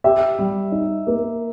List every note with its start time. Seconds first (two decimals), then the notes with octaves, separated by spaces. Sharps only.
0.04 G4 E5
0.39 G3
0.72 D#4
1.07 A#3